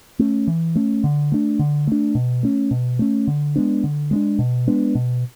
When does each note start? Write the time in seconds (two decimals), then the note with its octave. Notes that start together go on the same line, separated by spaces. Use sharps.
0.19 A3 C#4
0.47 E3
0.76 A3 C#4
1.04 D3
1.32 A3 D4
1.59 D3
1.87 A3 D4
2.15 B2
2.43 A3 C#4
2.71 B2
2.99 A3 C#4
3.27 D3
3.56 G#3 B3 D4
3.84 D3
4.11 G#3 B3
4.16 D4
4.39 B2
4.67 G#3 B3 D4
4.95 B2